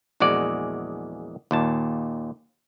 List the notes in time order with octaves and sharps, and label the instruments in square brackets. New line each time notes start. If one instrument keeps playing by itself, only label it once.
[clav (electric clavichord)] A#1 E2 G#3 F#4 D5
D#2 A#2 A5